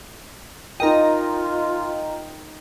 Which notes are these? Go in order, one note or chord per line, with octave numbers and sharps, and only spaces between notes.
D#4 F4 A#4 D#5 G5 A#5